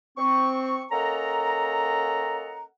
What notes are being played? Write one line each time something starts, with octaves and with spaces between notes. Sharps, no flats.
C4 C#6
A#3 C#4 A4 D#5 F#5 A#5